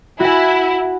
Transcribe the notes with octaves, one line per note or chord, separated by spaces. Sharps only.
E4 F#4 G#5